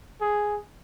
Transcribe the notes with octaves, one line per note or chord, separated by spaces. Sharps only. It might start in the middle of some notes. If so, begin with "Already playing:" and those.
G#4